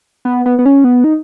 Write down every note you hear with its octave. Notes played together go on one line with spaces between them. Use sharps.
B3
B3
B3
C#4
B3
D#4